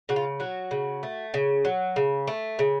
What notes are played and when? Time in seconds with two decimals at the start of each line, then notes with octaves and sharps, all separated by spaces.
0.09 C#3 F#4
0.16 F4
0.40 F#3 F#4
0.71 C#3
1.03 A3
1.34 C#3
1.65 F#3
1.96 C#3
2.28 A3
2.59 C#3